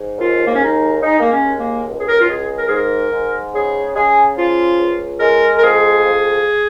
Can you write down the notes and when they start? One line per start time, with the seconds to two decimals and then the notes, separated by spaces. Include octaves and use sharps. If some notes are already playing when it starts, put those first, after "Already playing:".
Already playing: G#2
0.19 D#2 F4
0.45 A#3
0.53 C#4
0.61 G#3 D#4
1.02 G#3 D#4
1.20 A#3
1.31 C#4
1.45 D#2
1.58 A#3
1.86 C#2
2.00 G#4
2.07 A#4
2.18 F4
2.28 G#3 G#4
2.57 A#4
2.66 G#2 G#4
2.74 A#4
3.11 G#2
3.53 C#3 G#4
3.94 C#3 G#4
4.36 F3 F4
4.79 C#2
5.19 G#3 A#4
5.56 A#4
5.61 F2 G#4
6.04 F2